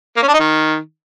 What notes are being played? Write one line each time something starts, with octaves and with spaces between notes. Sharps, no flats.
A#3
C#4
D4
D#4
D#3